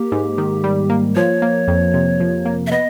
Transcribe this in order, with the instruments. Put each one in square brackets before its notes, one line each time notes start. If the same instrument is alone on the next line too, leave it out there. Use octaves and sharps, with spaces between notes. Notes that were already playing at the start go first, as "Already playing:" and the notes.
Already playing: [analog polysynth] A#3 [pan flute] G4
[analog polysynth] G#2
D#3
G3
A#3
[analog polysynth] F3 [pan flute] C#5
[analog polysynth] A#3
F2
C3
F3
A#3
[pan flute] E5
[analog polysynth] B3 [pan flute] D#5